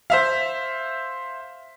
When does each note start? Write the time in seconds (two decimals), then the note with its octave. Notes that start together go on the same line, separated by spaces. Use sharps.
0.10 C5 E5 F5